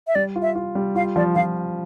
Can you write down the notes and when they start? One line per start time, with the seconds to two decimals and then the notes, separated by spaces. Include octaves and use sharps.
0.07 E5
0.15 G3 D5
0.36 F4
0.42 E5
0.56 F4
0.75 G3
0.95 F4 F5
1.16 F3 D5
1.35 F3 F5